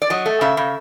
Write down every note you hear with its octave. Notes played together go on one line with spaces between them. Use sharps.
D5
F#3 D#5
A3
C#3 E5
C#3